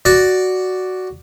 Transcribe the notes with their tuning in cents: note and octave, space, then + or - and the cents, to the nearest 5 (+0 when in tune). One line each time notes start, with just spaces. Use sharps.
F#4 +5 D5 +0